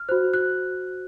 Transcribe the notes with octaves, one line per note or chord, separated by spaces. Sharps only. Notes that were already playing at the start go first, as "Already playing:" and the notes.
Already playing: F6
F#4 C5 F#6
F#6